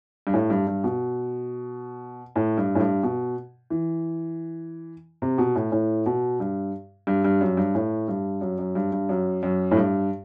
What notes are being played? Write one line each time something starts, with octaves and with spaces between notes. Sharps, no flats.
G2
A2
G2
G2
B2
A2
G2
A2
G2
B2
E3
C3
B2
A2
A2
B2
G2
G2
G2
F#2
G2
A2
G2
F#2
F#2
G2
G2
F#2
F#2
A2
G2